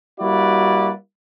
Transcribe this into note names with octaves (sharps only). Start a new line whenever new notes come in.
G3 A#3 E4 F#4 B4 D5